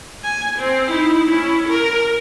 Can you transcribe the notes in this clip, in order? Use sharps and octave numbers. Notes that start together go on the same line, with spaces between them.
G#5
C4
D#4 E4
C#4 E4
A#4